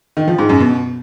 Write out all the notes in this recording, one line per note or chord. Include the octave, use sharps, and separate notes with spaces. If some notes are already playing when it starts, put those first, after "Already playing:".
D#3
F3
G#2
F#2
B2